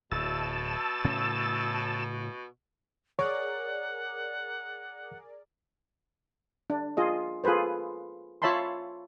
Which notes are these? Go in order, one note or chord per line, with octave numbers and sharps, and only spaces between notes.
D1 B2 A5 E6
A2 C#3 C#4
G#4 A#4 C#5 D5 F#5
D4
F4 G#4 D#5
F4 G#4 A4 B4 C5
F4 C#5 E5 A5 B5 C6